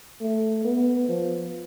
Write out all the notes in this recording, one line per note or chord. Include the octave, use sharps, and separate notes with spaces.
A3
B3
F3